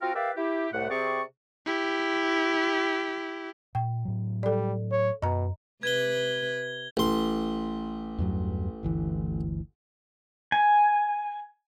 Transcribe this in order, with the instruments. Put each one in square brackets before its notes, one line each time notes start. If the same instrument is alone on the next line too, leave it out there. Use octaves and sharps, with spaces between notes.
[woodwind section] C4 F4 F#4 A#4 F5 G5
G4 A#4 B4 D5 E5 F5
E4 G4
C2 A2 A3 F#5
C3 C4 G#4 D5 C#6
[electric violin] E4 G4
[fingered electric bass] A#2 [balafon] G5
[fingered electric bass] A2 F#3
[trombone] G3 [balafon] A4 D5
[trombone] C#5
[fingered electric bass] F#2 [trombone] B2 [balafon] D#5 A#5
[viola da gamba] C3 B4 [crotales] G#6 G7
[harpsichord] A1 C6
[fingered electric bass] E2 G2 F#3
G1 D2 E3
[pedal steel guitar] G#5